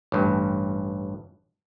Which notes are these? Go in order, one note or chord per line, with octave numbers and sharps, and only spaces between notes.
A1 G2